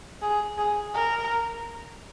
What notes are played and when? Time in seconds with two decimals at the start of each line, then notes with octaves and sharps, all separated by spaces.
0.22 G#4
0.58 G#4
0.94 A#4